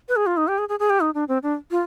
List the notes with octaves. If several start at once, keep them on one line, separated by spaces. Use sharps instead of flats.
B4
G#4
F4
D#4
G4
G#4
G#4
G#4
G4
D#4
D4
C4
D4
F4